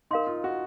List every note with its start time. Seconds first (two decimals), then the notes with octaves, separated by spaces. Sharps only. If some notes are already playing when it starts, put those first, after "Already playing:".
0.11 D#4 A#4 F5 C6
0.27 F4
0.44 F#4